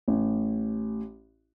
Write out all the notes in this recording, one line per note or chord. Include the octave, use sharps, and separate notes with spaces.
A1